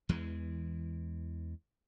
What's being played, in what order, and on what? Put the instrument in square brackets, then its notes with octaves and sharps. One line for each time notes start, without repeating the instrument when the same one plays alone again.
[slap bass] E2 E3 G#3